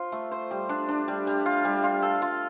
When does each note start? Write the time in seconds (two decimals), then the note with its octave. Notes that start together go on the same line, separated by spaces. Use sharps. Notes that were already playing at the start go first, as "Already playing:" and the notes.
Already playing: F4 C5
0.12 A3
0.31 C5
0.51 G3
0.69 D4
0.89 D4
1.08 G3
1.27 G3
1.46 F4
1.65 G3
1.84 F4
2.02 A4
2.22 F4